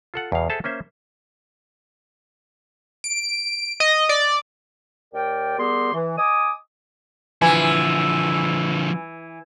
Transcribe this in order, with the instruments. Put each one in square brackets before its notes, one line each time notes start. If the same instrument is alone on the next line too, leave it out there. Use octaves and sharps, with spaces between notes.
[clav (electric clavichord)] F4 A4 F#5
E2 B2 F5
G#4 A4 C5 E5 F#5 A5
A#3 C#4 C5 E5
[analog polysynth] D7
D#5
D5
[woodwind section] D#2 A#4 D5 G5
G3 B3 G4 G#4 A#4 C6
E3
D#5 G#5 D6 D#6
[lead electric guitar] D3 F3 [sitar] E3 [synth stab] G#5